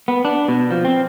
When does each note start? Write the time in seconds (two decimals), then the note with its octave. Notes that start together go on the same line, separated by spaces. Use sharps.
0.08 B3
0.25 D4
0.48 B2
0.71 F3
0.85 C4